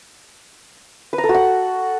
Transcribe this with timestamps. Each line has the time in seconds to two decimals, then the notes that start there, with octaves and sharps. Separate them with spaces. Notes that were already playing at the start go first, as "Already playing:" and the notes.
1.13 B4
1.18 A#5
1.24 A4
1.29 F#4
1.34 F#5